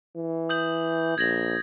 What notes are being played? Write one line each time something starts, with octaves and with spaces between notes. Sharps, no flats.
E3
D#6 G6 F#7
A#1 G#6 A#6 F#7